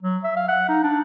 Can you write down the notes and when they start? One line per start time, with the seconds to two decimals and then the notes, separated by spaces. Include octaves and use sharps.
0.03 F#3
0.24 E5
0.36 F5
0.48 F#5
0.69 D#4
0.83 D4